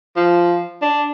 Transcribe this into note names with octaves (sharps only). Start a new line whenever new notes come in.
F3
D4